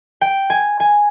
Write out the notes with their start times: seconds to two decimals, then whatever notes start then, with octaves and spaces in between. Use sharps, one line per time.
0.21 G5
0.50 G#5
0.80 G#5